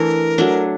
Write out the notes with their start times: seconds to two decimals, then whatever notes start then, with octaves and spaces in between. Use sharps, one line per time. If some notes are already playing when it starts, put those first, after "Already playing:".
Already playing: E3 A3 D4 A#4
0.38 F#3 A3 D4